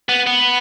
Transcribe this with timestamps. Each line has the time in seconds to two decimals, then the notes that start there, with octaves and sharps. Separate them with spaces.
0.09 B3
0.27 B3